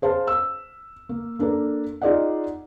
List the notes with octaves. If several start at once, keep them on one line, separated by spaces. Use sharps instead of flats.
G#4 C5 F5 A5
E6
A#3
A#3 D4 A4 A#4
D#4 F4 G#4 D5 D#5 F#5